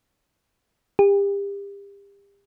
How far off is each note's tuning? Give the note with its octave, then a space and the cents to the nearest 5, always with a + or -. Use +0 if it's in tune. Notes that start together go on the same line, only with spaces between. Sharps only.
G4 +35